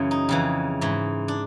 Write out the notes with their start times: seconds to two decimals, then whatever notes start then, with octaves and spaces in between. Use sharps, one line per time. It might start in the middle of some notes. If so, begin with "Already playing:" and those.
Already playing: F#2 C#3 E3
0.11 D#4
0.29 F2 C#3 E3
0.81 G#2 E3
1.28 D4